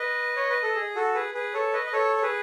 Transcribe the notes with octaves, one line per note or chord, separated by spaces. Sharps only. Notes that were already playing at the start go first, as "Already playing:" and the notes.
Already playing: B4 D#5
C#5
B4
A4
G#4
F#4 A4
G#4 B4
G#4 B4
A4 C#5
B4 D#5
D#5
A4 C#5
C#5
G#4 B4